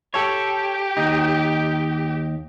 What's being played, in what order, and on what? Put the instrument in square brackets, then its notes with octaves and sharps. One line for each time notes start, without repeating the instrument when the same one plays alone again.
[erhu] G4 [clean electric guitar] A4 C#5
[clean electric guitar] D#2 D#4